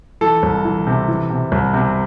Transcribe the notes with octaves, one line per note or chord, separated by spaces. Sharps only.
E3 A4
C2
E3
C3
E3
C3
C2
C3